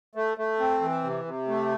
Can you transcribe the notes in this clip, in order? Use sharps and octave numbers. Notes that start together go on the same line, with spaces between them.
A3
A3
C4
E3
C3
C3
A3